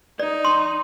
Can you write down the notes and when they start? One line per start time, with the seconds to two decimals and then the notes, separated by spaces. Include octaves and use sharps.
0.19 D#4 D5
0.45 C6